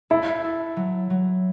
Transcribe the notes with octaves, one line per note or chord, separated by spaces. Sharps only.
E4 A4
A4
F#3
F#3